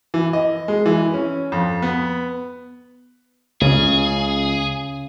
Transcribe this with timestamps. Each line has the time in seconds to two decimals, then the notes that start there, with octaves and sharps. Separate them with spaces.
0.14 E3
0.33 D#5
0.68 G#3
0.86 E3
1.14 C#4
1.52 F2
1.82 B3
3.61 C#2 C#3 G#4